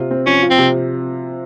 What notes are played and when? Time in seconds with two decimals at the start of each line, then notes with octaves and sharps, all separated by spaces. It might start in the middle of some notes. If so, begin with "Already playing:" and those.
Already playing: C3 F4
0.11 C4
0.27 F3 C#4
0.42 F4
0.50 C4
0.58 C3